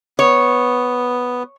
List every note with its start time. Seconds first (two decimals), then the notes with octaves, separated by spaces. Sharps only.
0.19 B3 C#5